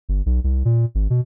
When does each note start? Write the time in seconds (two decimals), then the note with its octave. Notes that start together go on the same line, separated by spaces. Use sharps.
0.09 G1
0.26 B1
0.44 C2
0.65 A#2
0.95 G#1
1.10 B2